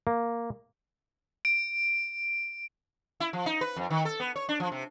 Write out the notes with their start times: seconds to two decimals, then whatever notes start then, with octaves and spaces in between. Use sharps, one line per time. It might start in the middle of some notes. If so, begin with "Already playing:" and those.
0.07 A#3
1.45 D7
3.20 E4
3.33 F3
3.46 D#4
3.61 B4
3.76 F2
3.90 D#3
4.05 A4
4.20 B3
4.36 C#5
4.49 D4
4.60 F3
4.72 C3